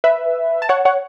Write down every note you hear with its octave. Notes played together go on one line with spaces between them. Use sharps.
B4 E5
A5
C#5 F#5
C#5 F#5